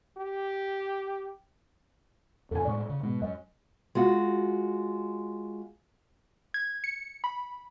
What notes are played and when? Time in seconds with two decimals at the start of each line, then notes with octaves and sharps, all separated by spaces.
0.18 G4
2.51 F2 C3 A4 G#5
2.65 A2 G#3 D5 C#6
2.89 C#3
3.03 G#2 B2
3.22 F#2 D#5
3.95 G#3 F4 F#4
6.54 G#6
6.84 C#7
7.24 B5